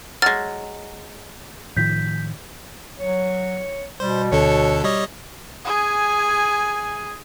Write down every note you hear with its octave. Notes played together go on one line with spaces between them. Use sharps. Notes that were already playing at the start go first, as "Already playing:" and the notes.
F#3 G#3 F6 A6
A2 D#3 F3 G6 B6
F#3 C#5
B2 G3 C5
D2 D3 A4 C#5
G3 C#5 D#5
G#4 G#5